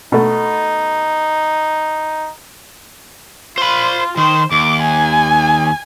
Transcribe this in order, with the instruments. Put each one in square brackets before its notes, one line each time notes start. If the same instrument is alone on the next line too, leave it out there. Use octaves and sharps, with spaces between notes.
[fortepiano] B2 A3 [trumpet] D#4
[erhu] F4 [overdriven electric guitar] C5 B5
[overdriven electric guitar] D#3 [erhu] C5
[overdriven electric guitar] D#2 [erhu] D6
[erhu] G#5